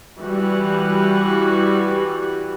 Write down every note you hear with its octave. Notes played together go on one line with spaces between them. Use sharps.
E3 G3 F#4